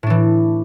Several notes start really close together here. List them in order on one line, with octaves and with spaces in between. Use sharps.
A2 D4 E3